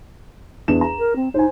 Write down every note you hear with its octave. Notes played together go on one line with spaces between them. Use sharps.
E2 D4 E7
A#5
A#4
C4
D#4 C5 G#5